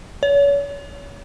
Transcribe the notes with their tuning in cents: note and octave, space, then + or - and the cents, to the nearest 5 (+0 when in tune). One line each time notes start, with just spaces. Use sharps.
C#5 +35